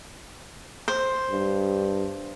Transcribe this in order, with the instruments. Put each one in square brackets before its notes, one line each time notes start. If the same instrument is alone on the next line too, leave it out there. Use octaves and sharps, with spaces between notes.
[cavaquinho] C5
[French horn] G2